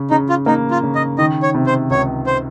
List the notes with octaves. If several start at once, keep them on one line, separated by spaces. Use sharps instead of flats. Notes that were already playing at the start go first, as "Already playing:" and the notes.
Already playing: C#3
C#3 D#4
F4
A#3 D#4
F4
C#3
D#5
D#3 D#5
C#5
C3
C5
C#2 C#5
C5